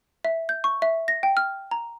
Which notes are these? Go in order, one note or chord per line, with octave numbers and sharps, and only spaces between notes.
E5
G6
C#6
E5
A#6
G5
F6
A#5